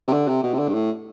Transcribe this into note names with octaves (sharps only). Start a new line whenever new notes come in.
C3
D3
C3
B2
C3
D3
G2
A2